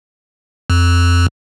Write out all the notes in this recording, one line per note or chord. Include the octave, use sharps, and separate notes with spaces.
F2